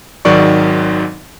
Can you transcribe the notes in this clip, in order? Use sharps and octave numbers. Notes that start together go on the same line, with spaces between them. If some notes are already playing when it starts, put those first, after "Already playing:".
G#1 G#2 D#3 F#3 D5 C#6